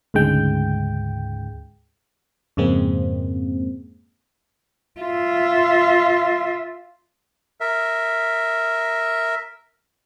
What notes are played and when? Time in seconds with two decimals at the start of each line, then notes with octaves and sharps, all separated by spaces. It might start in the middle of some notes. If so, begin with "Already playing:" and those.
0.14 D2 G#2 C#3 G#3 G5
2.57 F2 G#2 C#3 G#3 A#3 C4
5.01 F4 E5
7.61 A#4 E5